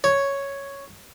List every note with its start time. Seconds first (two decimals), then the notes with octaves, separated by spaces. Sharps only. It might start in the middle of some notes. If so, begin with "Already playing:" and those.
0.04 C#5